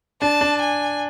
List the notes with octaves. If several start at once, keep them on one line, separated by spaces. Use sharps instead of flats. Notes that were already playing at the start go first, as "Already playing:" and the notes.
D4 A5
D4
G#5